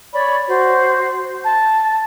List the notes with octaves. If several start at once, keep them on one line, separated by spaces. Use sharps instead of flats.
C#5 D5 B5 C#6
F#4 C5
A5